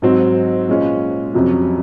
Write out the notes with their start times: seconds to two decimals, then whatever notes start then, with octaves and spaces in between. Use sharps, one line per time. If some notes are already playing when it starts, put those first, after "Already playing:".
0.02 G#2 F#3 C4
0.68 A#2 G#3 C#4
1.34 F2 C3 F#3 C#4